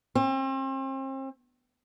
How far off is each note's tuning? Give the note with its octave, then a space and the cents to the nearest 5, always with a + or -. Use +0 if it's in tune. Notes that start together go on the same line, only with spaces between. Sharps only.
C4 +40